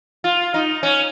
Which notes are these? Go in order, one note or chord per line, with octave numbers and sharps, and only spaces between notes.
F4
D#4
C#4